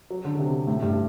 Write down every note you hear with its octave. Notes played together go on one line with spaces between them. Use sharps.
F#3
D3
D3
C3
A2
G2